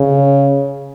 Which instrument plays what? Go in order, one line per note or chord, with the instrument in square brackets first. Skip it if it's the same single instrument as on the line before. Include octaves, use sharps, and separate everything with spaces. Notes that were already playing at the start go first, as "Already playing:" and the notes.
Already playing: [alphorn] C#3